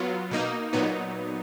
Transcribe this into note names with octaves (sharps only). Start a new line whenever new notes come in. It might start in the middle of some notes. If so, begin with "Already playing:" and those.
Already playing: F#3 B3 F4
B2 A#3 D#4
A#2 F#3 B3 D#4